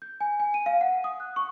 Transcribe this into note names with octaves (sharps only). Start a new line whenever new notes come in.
G6
G#5
G#5
D#7
F5
F#5
D#6
F#6
C#6